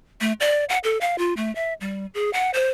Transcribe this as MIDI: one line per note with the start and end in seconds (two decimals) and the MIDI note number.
0.21 0.33 57
0.40 0.64 74
0.69 0.78 78
0.84 0.98 69
1.01 1.18 77
1.18 1.34 65
1.37 1.54 57
1.55 1.74 76
1.81 2.06 55
2.14 2.32 68
2.33 2.51 78
2.54 2.72 72